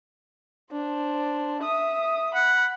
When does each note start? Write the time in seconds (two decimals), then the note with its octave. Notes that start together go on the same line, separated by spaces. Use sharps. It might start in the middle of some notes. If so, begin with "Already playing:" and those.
0.72 D4 C5
1.61 E5 D#6
2.35 F#5 B5